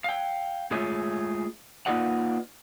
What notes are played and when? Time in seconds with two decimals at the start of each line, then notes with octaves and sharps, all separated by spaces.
0.04 F5 G5
0.71 G#3 A3 F4 G#4 C#5 E5
1.86 A#3 D#4 F4 B4 D5 F#5